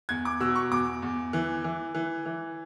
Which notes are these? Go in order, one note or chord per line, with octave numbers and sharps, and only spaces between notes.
E2 G#6
D6
B2 E6
C#6
E2 D6
E2
E3
E3
E3
E3